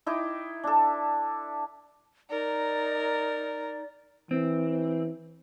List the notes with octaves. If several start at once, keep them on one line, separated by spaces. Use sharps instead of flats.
D#4 E4 G5 D6
D4 A4
D#4 A#4 D5
E3 C4